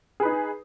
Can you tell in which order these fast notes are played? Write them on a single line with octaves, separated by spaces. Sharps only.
G#4 B4 D#4